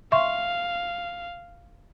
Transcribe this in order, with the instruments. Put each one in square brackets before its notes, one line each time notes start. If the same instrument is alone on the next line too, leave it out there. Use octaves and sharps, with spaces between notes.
[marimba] E5 C6 C#6 [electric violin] F5